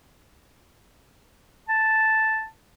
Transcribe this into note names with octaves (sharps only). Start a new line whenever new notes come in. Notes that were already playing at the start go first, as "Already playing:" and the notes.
A5